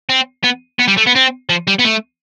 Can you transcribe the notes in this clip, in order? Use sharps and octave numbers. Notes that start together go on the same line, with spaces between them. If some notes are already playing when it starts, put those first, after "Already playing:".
C4
B3
B3
G3
A3
B3
C4
F3
G3
B3
A3